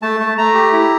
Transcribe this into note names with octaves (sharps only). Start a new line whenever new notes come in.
A3 A5
A3
A3 A#5
G4
E4